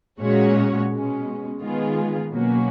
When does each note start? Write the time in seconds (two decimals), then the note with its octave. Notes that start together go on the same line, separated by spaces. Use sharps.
0.21 A#2 G#3 C#4 F#4 C#5
0.91 B2 G#3 C#4
1.62 D#3 G#3 B3 F4 G#4
2.31 B2 F#3 A#3 C#4 F#4